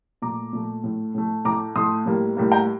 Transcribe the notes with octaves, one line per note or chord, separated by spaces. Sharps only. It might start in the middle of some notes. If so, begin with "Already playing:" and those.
A#2 A3 A#5 D6
A#2 A3
A2 A3
A2 A3
A2 A3 A#5 D6
A2 A3 C6 D#6
A2 G3 A#3
A2 G3 A#3
G5 A#5